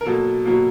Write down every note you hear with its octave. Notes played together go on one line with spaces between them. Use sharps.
A#4
B2 F#3 A#3 A4
B2 F#3 A#3